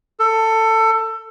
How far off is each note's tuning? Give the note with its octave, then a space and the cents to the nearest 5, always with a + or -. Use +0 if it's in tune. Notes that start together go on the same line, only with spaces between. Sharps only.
A4 +20